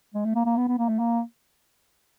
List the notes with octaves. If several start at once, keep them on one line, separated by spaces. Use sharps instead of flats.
G#3
A3
A#3
A#3
B3
B3
A#3
A3
A#3